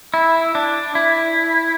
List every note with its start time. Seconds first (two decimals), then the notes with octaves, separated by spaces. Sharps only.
0.14 E4
0.55 D4
0.95 E4